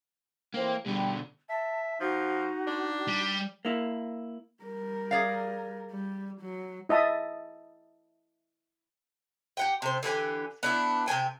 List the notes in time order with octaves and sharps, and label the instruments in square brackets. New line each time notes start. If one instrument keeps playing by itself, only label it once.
[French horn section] A2 E3 C4 [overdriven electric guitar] A#3
[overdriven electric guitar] B2 D3 [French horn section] G3
[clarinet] E5 [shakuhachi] A5
[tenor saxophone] F3 [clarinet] D#4 [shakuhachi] F#4
[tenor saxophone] D4
[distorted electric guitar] G3
[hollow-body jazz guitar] A#3 E4
[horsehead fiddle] G3 A#4
[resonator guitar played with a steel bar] G#4 D5 F5
[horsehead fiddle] G3
F#3
[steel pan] E4 D#5 E5 A5 D#6
[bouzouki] G4 F#5 G5
C3 C5
D3 E3 G4 G#5
B3 D4 E4
C3 A#3 G5 G#5